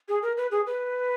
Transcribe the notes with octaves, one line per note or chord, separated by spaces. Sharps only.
G#4
A#4
B4
G#4
B4